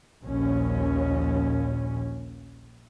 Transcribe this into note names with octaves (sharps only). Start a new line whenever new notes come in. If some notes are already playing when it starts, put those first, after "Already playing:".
A#1 D#2 A#2 C#4